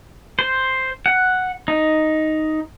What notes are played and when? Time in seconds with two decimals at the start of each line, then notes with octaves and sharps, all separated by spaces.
0.39 C5
1.06 F#5
1.68 D#4